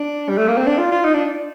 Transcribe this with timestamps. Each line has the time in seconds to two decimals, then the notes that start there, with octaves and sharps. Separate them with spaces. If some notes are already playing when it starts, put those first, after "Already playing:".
Already playing: D4
0.29 G3
0.37 A3
0.48 A#3
0.57 C4
0.66 D4
0.78 F4
0.92 F4
1.04 D#4
1.14 D4